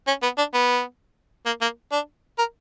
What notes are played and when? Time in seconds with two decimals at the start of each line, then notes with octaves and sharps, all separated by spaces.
0.07 C#4
0.23 B3
0.38 D4
0.54 B3
1.46 A#3
1.61 A#3
1.92 D4
2.38 A#4